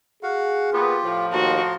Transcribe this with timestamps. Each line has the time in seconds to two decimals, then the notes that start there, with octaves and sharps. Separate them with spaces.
0.23 F#4 G#4 F5 F#5
0.73 A#2 B3 F4 G4
1.03 A2 F3
1.32 D#2 F#4 A5 A#5 C6